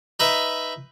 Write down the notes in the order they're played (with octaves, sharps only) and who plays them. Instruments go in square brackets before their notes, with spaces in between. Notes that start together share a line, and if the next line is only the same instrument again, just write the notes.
[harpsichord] D#4 B4 E5